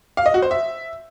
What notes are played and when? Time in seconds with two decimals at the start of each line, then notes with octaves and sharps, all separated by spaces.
0.17 F5
0.26 D#5
0.34 F#4
0.42 C5
0.51 E5